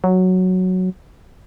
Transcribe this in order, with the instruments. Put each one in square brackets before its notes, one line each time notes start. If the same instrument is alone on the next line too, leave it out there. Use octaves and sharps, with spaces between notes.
[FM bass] F#3